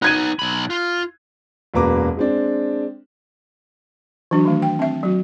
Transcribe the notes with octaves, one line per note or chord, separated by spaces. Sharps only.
B3 D#4 F#6 G#6 D#7
B1 B5
F4
E1 F#2 A#3 B4 A#5 D6
G#3 C4 D4
E3 F#3 D4 F#4
D#3 A3
G5
C4 E5
F#3 F#4